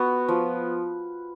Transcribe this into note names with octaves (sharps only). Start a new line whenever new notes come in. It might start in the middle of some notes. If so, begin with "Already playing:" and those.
Already playing: B3 F#4
F3